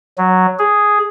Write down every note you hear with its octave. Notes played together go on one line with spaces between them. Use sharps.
F#3
G#4